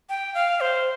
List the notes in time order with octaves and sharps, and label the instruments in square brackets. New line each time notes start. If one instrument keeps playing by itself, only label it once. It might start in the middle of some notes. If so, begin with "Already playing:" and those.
[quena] G5
F5
C5